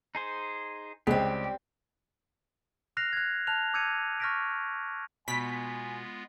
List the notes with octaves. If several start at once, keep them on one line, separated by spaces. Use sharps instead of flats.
D#4 G#4 C5
C#2 G3 G#3 C4 G4
F6 F#6 A#6 C7 F7
F#6 G#6
A5 F6 F#6 F7
D6 E6 G6 G#6 C#7 D#7
C#6 F6 G6 A#6 B6 D7
B2 G#3 B3 F4 G#5 B6